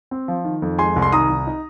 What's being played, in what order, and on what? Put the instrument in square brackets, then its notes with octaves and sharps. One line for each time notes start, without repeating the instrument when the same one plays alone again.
[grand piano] C4
F3
D#3
F2
G#3 G#5 C6
C2
C6
D#3 A#5 D#6
C2
D#4